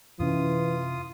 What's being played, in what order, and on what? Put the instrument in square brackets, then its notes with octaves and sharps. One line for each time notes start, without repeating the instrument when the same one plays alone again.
[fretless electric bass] F#2 C3 C#4 [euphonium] E3 [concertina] F4 D#6